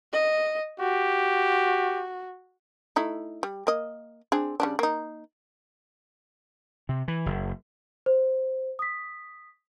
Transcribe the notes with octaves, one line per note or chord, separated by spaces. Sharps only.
D#5
F#4 G4
A3 D#4 E4
G3
A#3 D#5
C4 D4 G#4
C#3 G3 D4
A#3 D#4
C3
E3
F#1
C5
D#6 B6